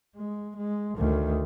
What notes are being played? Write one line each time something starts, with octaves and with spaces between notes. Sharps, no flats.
G#3
G#3
D2 D#3